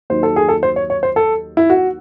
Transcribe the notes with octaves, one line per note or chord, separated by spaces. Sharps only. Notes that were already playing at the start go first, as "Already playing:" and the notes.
D#2 D#3 F#3 C5
A4
G#4
A4
C5
C#5
C#5
C5
A4
E4
F#4